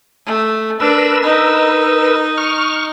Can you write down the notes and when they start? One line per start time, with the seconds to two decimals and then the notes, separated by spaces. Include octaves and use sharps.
0.26 A3
0.80 D4 A#4 B4 E6
1.23 D#4
2.38 C#6 F6